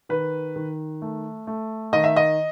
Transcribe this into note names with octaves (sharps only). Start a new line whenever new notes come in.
D#3 B4
D#3
A3
A3
D#3 D#5
E5
D#5